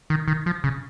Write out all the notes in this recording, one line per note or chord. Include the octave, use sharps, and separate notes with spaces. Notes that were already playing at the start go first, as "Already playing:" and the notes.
D#3
D#3
F3
C#3